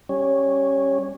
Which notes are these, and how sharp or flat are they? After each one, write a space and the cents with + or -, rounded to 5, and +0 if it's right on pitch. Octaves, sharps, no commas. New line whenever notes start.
G3 +5 C#4 -10